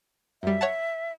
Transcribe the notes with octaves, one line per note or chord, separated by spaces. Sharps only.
F#2 G3 E5
C#5 F#5 A5